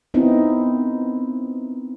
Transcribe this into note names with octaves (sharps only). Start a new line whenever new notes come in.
B3 C4 D#4 E4